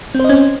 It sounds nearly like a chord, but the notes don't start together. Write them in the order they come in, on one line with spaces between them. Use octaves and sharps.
C4 C5 D#5 C#4